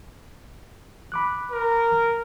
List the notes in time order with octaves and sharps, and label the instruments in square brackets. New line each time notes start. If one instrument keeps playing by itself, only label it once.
[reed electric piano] B5 D6 F#6
[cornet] A#4